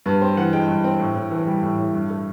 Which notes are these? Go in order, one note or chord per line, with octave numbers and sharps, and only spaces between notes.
G2 B4
C4 C5
E3 F#5
G#3 G5
G2
C4
A2
A2
E3
G3
A2
A2
G2
A3